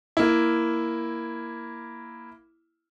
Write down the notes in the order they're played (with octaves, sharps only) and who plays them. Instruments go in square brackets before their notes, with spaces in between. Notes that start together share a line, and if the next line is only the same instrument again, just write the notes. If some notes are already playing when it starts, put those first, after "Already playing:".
[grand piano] A#3 E4